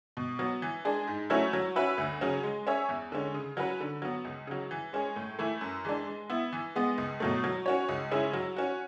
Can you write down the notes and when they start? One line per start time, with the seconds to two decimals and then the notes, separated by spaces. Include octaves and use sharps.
0.17 B2
0.39 F#3 B3
0.62 E3
0.85 G#3 D4 G#4
1.07 G#2
1.30 F#3 A3 C#4 E4
1.53 F#3
1.76 C#4 F#4 B4 E5
1.98 D2
2.21 C#3 F#3 C#4
2.43 G#3
2.67 C#4 G#4 C#5 E5
2.89 E2
3.12 D3 G#3 C#4
3.34 C#3
3.57 F#3 C#4 F#4 B4
3.80 D3
4.02 F#3 B3
4.25 C#2
4.47 C#3 F#3
4.71 E3
4.93 G#3 C#4 G#4
5.16 A2
5.39 E3 A3 E4
5.61 F#2
5.85 E3 G#3 D4
6.07 G#3
6.30 B3 E4
6.52 E3
6.76 G#3 B3
6.98 C#2
7.20 B2 F#3 A3
7.44 F#3
7.66 C#4 F#4 C#5
7.89 C#2
8.12 C#3 G#3 C#4 E4
8.33 F#3
8.56 C#4 F#4